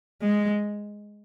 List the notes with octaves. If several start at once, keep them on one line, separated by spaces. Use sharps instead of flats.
G#3